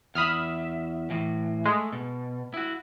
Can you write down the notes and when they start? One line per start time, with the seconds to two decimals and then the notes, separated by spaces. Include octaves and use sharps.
0.15 E2 E5 B5 D#6 F6
1.11 A2 E3
1.66 G#3 A3
1.93 B2
2.54 E4 F#4